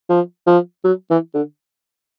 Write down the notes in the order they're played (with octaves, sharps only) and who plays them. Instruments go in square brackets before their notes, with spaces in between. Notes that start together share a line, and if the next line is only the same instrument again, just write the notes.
[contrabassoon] F3
F3
F#3
E3
D3